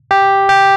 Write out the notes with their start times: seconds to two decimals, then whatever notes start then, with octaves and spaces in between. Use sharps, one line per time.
0.11 G4
0.49 G4